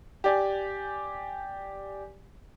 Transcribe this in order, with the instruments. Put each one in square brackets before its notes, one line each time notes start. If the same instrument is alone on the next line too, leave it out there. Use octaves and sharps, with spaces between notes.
[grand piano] G4 D5 G#5